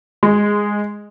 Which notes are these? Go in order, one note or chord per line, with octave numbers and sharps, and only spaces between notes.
G#3